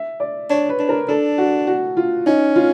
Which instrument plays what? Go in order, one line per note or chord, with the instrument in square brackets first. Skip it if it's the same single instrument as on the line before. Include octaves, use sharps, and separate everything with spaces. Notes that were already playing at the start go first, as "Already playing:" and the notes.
Already playing: [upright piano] E5
D5
[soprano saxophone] D4 [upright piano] C#5
[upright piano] B4
[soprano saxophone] D4
[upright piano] A#4
[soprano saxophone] D4 [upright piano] A4
[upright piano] F#4
F#4
F4
[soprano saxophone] C#4 [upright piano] D#4
[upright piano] F4